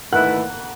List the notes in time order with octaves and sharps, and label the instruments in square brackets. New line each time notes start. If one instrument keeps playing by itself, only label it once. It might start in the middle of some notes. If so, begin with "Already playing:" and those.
[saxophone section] D#3 A3 E4 B4 [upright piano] F#5 F#6